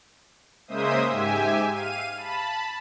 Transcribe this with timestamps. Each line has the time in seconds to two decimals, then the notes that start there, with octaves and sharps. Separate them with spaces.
0.68 C#3 G#3 A#3 C5 E5 D#6
1.08 G#2 G4 E5 G#5
1.70 F5 D#7
2.17 A5 B5